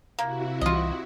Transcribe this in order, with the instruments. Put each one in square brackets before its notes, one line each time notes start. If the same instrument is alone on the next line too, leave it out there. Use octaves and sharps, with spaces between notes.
[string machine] C3 E4 F#4 [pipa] A#3
[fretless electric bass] C2 E3 [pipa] F4 D#5